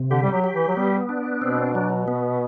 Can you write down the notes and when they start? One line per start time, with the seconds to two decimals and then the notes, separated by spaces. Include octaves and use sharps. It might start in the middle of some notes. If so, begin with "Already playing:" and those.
Already playing: C3
0.10 D3 G4
0.23 G3
0.32 F#3
0.44 G4
0.55 E3
0.68 F#3
0.76 G3 B3
1.09 D4
1.42 B2 C4
1.75 F#3
2.08 B3